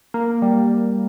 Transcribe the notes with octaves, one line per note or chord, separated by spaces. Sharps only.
A#3
G3